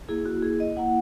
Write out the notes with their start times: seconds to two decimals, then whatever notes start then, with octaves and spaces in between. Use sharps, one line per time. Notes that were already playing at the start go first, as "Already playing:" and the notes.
0.09 A#3 E4 G#4
0.26 F#4
0.42 G#4
0.60 D#5
0.77 A#3 E4 F#5